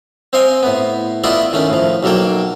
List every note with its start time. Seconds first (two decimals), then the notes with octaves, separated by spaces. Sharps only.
0.33 C4 C5 D#5 F5 G#5
0.63 A2 B3
1.24 A3 B3 E4 F4 D5 D#5
1.53 D#3 A3 C#4
1.70 A2 F3
2.03 B1 F#3 A#3 A4 G5